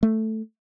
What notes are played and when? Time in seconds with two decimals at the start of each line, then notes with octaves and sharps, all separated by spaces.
0.03 A3